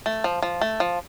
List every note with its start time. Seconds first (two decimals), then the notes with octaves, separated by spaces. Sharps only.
0.06 A3
0.24 F3
0.42 F3
0.61 A3
0.80 F3